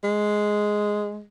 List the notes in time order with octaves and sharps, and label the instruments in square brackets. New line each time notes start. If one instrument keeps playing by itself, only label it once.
[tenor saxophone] G#3